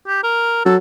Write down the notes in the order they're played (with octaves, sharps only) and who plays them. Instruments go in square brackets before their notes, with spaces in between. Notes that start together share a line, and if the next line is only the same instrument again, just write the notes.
[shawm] G4
A#4
[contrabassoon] F#3 [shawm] A4